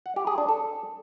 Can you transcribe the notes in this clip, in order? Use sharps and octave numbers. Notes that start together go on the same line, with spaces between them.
F#5
G4
G#4
D4
A4